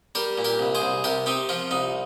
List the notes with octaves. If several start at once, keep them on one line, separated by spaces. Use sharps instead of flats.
G3 G4 A#4
A#2
G4 A#4
C2
G#4 C5
C2
C3 G4 A#4
C4 D#4 G4
F3 F4
C2 D#4